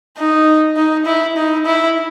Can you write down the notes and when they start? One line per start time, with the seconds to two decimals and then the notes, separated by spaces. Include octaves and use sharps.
0.17 D#4
0.76 D#4
1.06 E4
1.37 D#4
1.66 E4